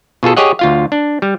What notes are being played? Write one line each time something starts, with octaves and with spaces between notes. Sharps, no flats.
B2 F4 G#4 A4
G4 G#4 C#5 D#5 F#5
D2 F4 F5
D4
G3